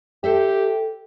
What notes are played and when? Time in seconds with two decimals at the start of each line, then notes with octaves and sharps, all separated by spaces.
0.24 G4 A4 C5 E5